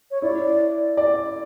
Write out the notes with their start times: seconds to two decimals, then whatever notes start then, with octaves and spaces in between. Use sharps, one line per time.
0.11 C#5
0.22 E4 D5
0.97 D5